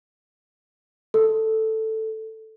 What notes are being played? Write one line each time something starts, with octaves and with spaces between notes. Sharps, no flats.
A4